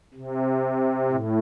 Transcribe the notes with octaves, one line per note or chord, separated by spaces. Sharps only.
C3
A2